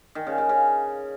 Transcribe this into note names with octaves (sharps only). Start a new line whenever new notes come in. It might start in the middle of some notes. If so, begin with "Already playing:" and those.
D#3
C#3
C#3
C#3